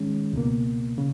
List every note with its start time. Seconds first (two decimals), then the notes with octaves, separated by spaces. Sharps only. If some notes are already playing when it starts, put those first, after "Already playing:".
Already playing: D#3 G#3 C#4
0.33 C#2 B2 A#3
0.98 C#3